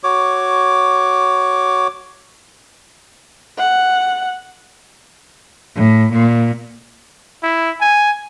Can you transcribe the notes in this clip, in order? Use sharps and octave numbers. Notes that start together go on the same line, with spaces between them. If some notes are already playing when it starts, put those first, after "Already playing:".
F#4 C#5 D6
F#5
A2
A#2
E4
G#5